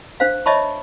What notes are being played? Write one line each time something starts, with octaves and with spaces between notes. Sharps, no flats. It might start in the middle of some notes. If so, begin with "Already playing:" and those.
D4 C5 F5
C#5 D#5 E5 A5 B5 C#6